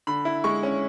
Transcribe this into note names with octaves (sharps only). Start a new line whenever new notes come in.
D3 B5
E4
G#3 C#6
C#4